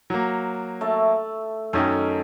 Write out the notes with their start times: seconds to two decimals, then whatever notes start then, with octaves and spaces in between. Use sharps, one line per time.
0.10 F#3 A#3
0.81 A3 E5 A5
1.73 F#2 D#3 C#4 D#4 A4